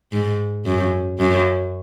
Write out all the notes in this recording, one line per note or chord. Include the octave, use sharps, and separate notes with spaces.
G#2
F#2
F#2